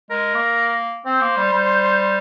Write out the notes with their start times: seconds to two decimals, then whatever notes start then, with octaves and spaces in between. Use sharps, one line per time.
0.11 G#3 A#4
0.34 A#3
1.05 C4 C5
1.21 A#3
1.37 G3
1.53 G3